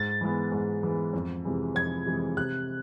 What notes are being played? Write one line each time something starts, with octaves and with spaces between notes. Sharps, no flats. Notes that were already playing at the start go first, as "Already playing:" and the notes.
Already playing: G#2 A6
E3 G#3 B3
G#2
E3 G#3 B3
F2
C3 E3 G#3
F2 G#6
C3 E3 G#3
C3 F#6